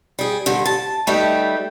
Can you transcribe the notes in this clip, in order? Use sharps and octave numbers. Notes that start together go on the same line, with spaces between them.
G3 G#4
G2 D3
A5
G3 A3 D#4 G4 B4 E5